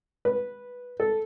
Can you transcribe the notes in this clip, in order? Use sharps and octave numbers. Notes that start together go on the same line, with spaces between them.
B4
A4